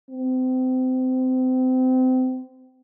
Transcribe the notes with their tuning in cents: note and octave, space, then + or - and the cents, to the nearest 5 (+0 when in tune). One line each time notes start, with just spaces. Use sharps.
C4 -30